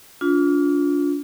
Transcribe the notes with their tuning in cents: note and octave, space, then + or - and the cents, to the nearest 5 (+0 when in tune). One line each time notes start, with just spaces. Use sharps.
D4 -35 F4 +15